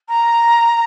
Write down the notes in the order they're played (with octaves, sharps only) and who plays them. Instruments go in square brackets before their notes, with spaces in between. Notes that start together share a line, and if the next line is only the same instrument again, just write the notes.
[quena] A#5